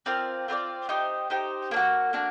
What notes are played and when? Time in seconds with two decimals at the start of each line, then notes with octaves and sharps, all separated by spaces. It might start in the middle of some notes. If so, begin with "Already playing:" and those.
0.06 C4 F4 A#4 D5
0.48 C4 F4 A#4 D5
0.89 D#4 G4 C5
1.30 D#4 G4 C5
1.71 A#3 D4
1.76 F#4
2.13 A#3 D4 F#4